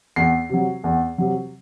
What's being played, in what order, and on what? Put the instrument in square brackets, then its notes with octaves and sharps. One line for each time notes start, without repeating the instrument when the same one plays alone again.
[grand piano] E2 C7
C3 F#3
E2
C3 F#3